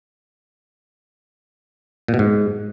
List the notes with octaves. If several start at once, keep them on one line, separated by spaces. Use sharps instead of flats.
A#2
B2
G#2